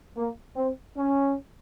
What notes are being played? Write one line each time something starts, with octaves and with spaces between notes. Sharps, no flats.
A#3
C4
C#4